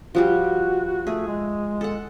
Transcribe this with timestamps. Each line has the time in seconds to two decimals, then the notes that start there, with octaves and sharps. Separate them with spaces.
0.15 F3 G3 F#4 G4
1.07 A3 G#4
1.27 G#3
1.81 A4 F#5